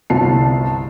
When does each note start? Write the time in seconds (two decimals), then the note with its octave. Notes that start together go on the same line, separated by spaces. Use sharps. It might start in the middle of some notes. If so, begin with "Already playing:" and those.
0.10 G1 C2 A5 C7